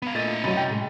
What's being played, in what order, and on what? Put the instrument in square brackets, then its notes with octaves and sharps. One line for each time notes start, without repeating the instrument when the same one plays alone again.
[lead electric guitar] B3 F5 [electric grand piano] B5
[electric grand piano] A#2 A3 A6 [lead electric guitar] E4 D#5
[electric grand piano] F#2 B5 [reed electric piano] C3 F#3
[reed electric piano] G5 A6
A2 C3 G#3